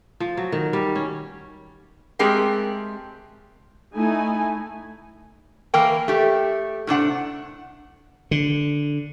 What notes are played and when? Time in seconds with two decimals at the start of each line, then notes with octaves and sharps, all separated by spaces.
0.20 F3
0.37 F#3
0.52 D#3
0.73 G3
0.95 C#4
2.19 G#3 A3 C4 G4 G#4 A#4
3.95 A3 D#4 E4 G#5
5.74 E3 A#3 A#4 G5
6.08 A3 G4
6.87 A2 C3 D4 F#5
8.31 D3